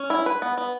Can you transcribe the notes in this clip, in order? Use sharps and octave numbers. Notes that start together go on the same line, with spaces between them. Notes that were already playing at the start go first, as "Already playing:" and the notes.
Already playing: C#4
E4
B4
B3
B3